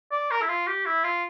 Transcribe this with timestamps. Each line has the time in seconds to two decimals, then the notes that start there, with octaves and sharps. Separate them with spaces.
0.12 D5
0.31 A#4
0.42 E4
0.49 F4
0.67 G4
0.85 E4
1.04 F4